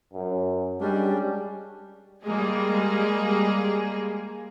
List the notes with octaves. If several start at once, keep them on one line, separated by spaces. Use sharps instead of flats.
F#2
G3 G#3 C#4 D4
G3 G#3 A#3 G#4